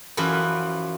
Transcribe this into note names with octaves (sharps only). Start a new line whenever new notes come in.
F#2 E3 F3 B4